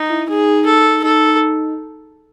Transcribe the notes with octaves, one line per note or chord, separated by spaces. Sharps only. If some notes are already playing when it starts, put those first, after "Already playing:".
Already playing: D#4
E4
D#4 G#4
A4
D#4 A4